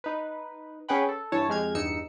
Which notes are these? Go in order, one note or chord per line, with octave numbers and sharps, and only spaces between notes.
D#4 B4
C#4 G#4 B4 F#5 G5 B5
A4
G2 E3 E4 C#5 A5
F2 G#3 G4 F6 G#6
E2 G2 D#4 E6 C#7